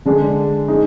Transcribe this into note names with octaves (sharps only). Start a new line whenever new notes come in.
D3 G#3 D4
G#3 D#4